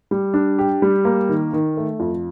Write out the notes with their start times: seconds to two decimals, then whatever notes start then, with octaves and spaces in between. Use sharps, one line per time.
0.11 G3
0.34 D4
0.59 G4
0.82 G3
1.05 A#3
1.29 D#3
1.53 D#3
1.77 A3
2.00 F2